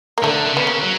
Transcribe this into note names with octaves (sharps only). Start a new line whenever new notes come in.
A#3
D3 A3
D3
C#3 B3
A#3
F#3